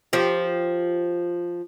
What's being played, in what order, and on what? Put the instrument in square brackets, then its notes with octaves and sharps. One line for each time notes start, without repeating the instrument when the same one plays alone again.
[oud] F3 G4